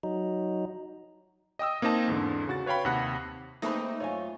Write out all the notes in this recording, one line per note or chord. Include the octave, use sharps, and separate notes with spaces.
F#3 D#4
D#5 G5 D#6 E6
A#3 C4 D#4 D#5 A5
E2 G#2 D3
C#3 F#4 A6
B4 C#5 F5 G5 B5
D#2 C3 F#5 B5 F#6
A3 A#3 C4 D#4 G#4 B4 B5
F#2 F4 C#5 G#5